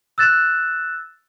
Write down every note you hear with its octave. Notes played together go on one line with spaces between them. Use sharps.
E6 F#6 A6 E7